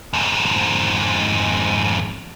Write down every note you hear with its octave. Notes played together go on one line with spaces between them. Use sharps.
F2 G#2